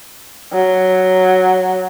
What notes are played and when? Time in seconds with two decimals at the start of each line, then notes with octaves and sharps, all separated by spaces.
0.53 F#3